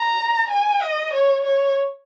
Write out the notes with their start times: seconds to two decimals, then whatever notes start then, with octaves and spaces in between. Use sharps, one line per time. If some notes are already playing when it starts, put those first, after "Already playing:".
Already playing: A#5
0.51 G#5
0.82 D#5
1.14 C#5
1.45 C#5